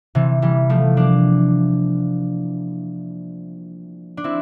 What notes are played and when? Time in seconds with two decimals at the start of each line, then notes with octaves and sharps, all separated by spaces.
0.15 C3 E3
0.42 E3 G3
0.70 F3 A3
0.97 A#3 D4
4.17 D4
4.24 C4 E4